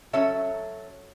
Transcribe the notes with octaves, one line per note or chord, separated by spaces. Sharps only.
F#3 C#4 A4 C#5 E5